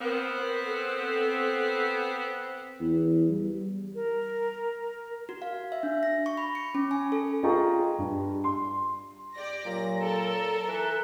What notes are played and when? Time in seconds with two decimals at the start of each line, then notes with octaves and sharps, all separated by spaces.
0.01 B3 C4 A#4
0.65 A4
2.80 E2
3.30 G3
3.95 A#4
5.29 F#4
5.42 F5
5.72 E5
5.83 D4
6.03 A#6
6.26 C#6
6.37 B5
6.55 C#7
6.75 C#4
6.91 G#5
7.12 A4
7.43 F4 G#4 D#5 G5 A#5 C#6
7.98 G2
8.44 C6
9.33 G4 D5 A#6
9.66 A#2 F#3 A#6
10.00 A4 A#4
10.68 E3 B4